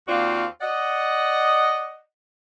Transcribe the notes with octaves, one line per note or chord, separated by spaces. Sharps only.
D#2 C4 F4 F#4 D5 F5
D5 D#5 F#5